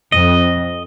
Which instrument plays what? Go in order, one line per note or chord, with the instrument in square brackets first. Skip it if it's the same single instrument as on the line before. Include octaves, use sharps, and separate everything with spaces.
[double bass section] F2 [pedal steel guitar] D#5